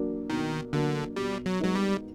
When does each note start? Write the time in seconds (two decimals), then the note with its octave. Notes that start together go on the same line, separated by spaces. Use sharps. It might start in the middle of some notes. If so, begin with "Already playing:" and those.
Already playing: F#3 A#3 D4
0.29 B2 D#3
0.73 D3 F#3 A#3 D4
1.16 B2 G3
1.46 F#3
1.60 F#3 G#3 B3 D#4
1.75 G3